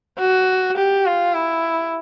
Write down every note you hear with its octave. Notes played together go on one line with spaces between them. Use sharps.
F#4
G4
F4
E4